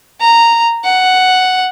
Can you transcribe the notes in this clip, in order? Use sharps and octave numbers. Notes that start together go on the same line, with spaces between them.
A#5
F#5